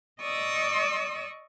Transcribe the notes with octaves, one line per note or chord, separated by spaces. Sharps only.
D5 D#5 C#6 D#6 E6